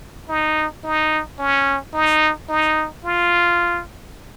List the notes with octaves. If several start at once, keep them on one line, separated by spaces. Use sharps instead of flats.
D#4
D#4
C#4
D#4
D#4
F4